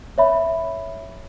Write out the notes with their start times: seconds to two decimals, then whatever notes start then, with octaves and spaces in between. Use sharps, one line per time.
0.18 C#5 E5 B5